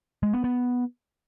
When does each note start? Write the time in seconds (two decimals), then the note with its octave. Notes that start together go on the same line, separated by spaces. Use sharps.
0.23 G#3
0.33 B3
0.44 B3